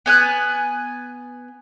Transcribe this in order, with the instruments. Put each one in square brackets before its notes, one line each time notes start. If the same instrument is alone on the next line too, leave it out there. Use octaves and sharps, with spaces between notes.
[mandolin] B3 G#5 F#6